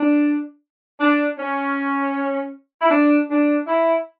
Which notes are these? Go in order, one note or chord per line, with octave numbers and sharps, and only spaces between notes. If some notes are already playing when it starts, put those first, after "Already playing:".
Already playing: D4
D4
C#4
E4
D4
D4
E4